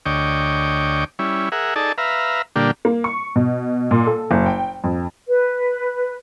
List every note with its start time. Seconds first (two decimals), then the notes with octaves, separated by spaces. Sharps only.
0.06 D2 C#5 D#5 G5 D6
1.19 G3 C#4 E4
1.52 G#4 A#4 E5 F#5
1.76 D#4 G#4 A4 D5 A5
1.98 B4 E5 F5 A#5
2.56 A#2 D3 G3 A#3 D4 G4
2.85 A#3
3.04 C#6
3.36 B2
3.91 A#2
4.07 A4
4.31 F#1
4.46 G5
4.84 F2
5.28 B4